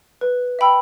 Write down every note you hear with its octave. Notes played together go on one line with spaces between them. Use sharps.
B4
E5 G5 B5 E6